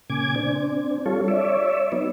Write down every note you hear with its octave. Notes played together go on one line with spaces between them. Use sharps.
A#2 C#3 G#5 D6 G#6
C4 D4
G3 F4 A4 C#5
C#5 D5 E5
F#3 B3 D#4